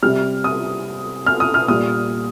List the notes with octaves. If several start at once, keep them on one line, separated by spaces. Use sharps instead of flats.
C3 G3 F6
D#6
F6
D#6
F6
A#2 G3 D#6